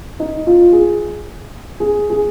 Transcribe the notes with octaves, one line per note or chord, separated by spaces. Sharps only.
D#4
F4
G#4
G#4
G#4